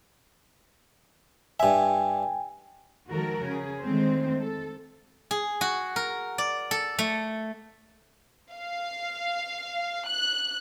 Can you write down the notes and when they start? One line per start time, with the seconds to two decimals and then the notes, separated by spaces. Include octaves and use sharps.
1.60 G2 E5 G5 G#5
3.10 D#3 F3 G#3 F#4 A4 A#4
3.43 C#3 C#4 G#4
3.82 D3 D#3 G#3 A3 C4 C5
4.41 A4
5.31 G#4
5.61 F#4
5.96 A#4
6.38 D5
6.71 A4
6.99 A3
8.52 F5
10.07 F#6